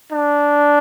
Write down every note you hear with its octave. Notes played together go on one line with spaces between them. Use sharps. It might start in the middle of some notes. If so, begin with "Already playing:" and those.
D4